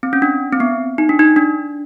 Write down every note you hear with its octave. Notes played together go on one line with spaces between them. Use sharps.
C4
C#4
D4
C4
B3
D#4
D4
D#4
D4